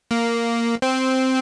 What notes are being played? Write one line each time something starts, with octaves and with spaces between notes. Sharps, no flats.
A#3
C4